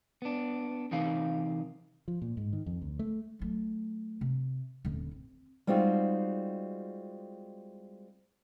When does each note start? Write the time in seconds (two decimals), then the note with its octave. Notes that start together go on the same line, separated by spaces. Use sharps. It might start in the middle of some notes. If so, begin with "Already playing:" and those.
0.22 B3 D4
0.91 C3 E3 D#4 A#4 F5
2.08 F3
2.22 A#2
2.37 G#2
2.53 D#3
2.66 F2
2.81 D2
2.99 A3
3.39 F#3 A3
4.21 C3
4.85 D#1 D3
5.11 C4
5.67 G3 G#3 C4 D#4 F4 F#4